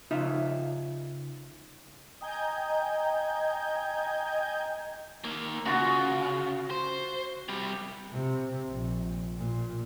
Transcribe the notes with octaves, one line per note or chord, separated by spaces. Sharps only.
C#3 D#4 F4 E5
D#5 G5 G#5 A#5 G6 G#6
D#3 A#3
C#3 F4 F#4
C5
C3 G3
C3
A#1
A#2